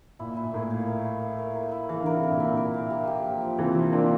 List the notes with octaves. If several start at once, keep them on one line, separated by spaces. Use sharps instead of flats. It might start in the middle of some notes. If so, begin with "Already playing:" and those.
A#2 E4
E4
A#2
A2 A#4
F5
A#4
E4
F5
A#4
A#4
E4
E3 F5
D3 A#4
C3
A#4
A#2 D3
E4
A#4
F5
G4
G4
F3
F3
C3 E3 F3
F3
A#3 C4 D4